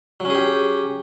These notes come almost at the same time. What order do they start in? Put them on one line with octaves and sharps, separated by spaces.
F#3 C#4 G#4 G4